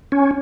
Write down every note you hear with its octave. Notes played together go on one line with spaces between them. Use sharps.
C#4